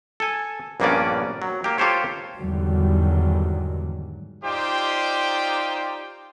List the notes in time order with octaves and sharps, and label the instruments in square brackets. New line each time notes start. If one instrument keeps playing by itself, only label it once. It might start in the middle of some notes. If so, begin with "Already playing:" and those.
[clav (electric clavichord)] A4 G#5
A#1 G2 A#3 B3 C#4 D5
F#3
A#3 G4
F4 G4 A4 C5 C#5
[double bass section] E2 G#2 D3 D#3 F#3 G3
[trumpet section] D#4 F4 G4 C5 D5 G5